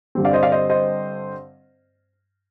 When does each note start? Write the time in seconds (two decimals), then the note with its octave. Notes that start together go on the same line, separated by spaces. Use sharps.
0.15 G2 D3 G3 C4
0.25 D5 F5
0.33 C5 D#5
0.43 D5 F5
0.52 C5 D#5
0.70 C5 D#5